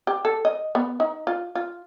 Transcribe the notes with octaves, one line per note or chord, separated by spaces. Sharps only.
G4
A4
D#5
B3
D#4
F4
F4